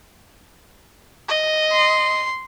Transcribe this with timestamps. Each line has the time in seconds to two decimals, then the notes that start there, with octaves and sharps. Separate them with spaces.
1.29 D#5
1.72 C6